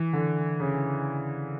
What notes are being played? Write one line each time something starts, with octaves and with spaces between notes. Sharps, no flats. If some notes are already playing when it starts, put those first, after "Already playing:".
Already playing: E3
D3
C#3